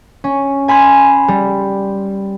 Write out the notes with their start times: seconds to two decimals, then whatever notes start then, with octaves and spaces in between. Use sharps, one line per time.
0.24 C#4
0.68 G#5 B5 C6 G#6
1.28 G3